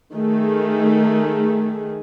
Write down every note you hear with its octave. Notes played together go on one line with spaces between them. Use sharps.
D#3 A3 G#4